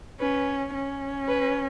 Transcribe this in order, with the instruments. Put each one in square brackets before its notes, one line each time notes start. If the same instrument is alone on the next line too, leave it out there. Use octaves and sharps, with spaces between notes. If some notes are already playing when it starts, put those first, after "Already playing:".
[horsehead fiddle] C#4 [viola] B4
[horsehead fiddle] C#4
[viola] B4